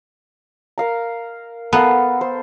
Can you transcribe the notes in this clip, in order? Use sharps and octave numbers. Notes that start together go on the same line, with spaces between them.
A#4 F5 A#5
B3 A4 A#4 F5
C5